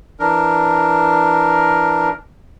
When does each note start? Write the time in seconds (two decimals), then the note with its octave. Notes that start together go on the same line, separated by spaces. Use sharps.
0.19 E3 D4 A#4